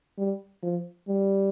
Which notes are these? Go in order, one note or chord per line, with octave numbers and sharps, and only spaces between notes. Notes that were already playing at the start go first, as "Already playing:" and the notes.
G3
F3
G3